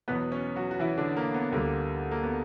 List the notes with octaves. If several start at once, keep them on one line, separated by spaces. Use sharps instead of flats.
E2 B2 F#3 B3 B4
C#4 C#5
F#3 F#4
F#4
E3 E4
D3 D4
A#3
B3
D2 D3 G3 A#3
A#3
B3